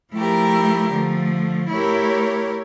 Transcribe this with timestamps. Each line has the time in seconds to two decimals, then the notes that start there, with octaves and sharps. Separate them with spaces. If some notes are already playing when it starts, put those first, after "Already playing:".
0.13 F3 A3 E4 G4 A#4
0.92 D3 F3 A3
1.71 A3 E4 G4 A#4 C#5